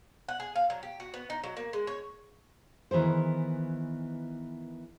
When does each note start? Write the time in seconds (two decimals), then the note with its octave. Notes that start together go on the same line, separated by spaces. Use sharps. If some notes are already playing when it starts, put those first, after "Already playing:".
0.29 F#5
0.40 G#4
0.56 F5
0.70 F#3
0.83 G4
1.00 F#4
1.14 B3
1.30 D#4
1.44 F#3
1.57 A#3
1.73 G#3
1.87 C#5
2.91 D#3 E3 B3 G#4 C5